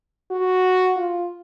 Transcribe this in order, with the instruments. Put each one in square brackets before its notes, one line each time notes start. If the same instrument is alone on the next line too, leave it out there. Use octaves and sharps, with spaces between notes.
[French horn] F#4
F4